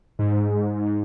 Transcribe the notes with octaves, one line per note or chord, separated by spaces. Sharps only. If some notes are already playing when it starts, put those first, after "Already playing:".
G#2